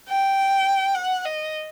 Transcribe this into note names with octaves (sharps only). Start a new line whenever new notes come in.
G5
F#5
D#5